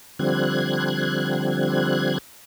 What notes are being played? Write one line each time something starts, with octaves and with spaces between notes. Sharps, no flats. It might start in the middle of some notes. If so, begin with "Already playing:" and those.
D3 F3 G3 C4 F#6 G#6